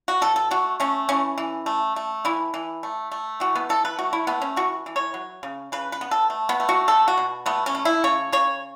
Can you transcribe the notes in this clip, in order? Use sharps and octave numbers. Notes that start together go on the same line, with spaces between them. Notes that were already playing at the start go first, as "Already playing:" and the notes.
F#4
B2 A4
A4
A3 F#4
A3 C#4
E3 C#4
E3
A3
A3
E3 E4
E3
A3
A3
E3 F#4
B3
E3 A4
B4
A3 F#4
E4
A3 B3
C#4
E3 F#4
E3
C#5
F#3
C#3
C#3 B4
B4
B3
A4
A3
B3
A3
F#4
B2 A4
F#4
B2
A3 B3
C#4
A3
E4
C#3 C#5
C#3 C#5